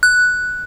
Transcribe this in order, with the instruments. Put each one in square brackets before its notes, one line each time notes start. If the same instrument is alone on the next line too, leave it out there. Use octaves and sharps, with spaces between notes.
[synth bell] F#6